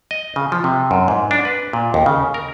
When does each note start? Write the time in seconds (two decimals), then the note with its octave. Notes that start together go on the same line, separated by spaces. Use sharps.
0.11 D#5
0.36 C#3
0.52 F3
0.64 C3
0.91 F#2
1.08 G#2
1.31 D4
1.45 B4
1.73 A#2
1.94 D#2
2.06 C#3
2.34 A#4